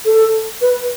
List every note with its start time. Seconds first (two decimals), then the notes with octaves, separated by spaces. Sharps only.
0.05 A4
0.61 B4